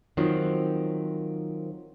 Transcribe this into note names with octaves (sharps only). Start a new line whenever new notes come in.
D#3 F3 F#3 C4